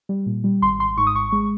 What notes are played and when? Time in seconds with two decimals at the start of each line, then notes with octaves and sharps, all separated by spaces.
0.09 G3
0.26 A#2
0.44 G3
0.62 G#1 C6
0.79 G#1 C6
0.97 G#2 C#6
1.07 D#6
1.15 G#1 C#6
1.32 G#3